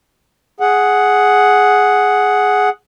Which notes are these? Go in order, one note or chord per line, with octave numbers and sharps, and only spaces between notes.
G#4 F#5